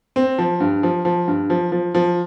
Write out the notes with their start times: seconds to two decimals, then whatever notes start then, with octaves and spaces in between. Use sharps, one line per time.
0.16 C4
0.38 F3
0.60 G2
0.83 F3
1.05 F3
1.28 G2
1.50 F3
1.72 F3
1.95 F3